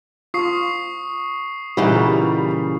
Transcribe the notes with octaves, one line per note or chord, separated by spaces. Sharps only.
F4 C#6 D#6 C7
A#2 C#3 E3 G3 D#4 E4 F#4